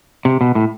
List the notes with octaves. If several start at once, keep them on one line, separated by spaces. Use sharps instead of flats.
C3
B2
A2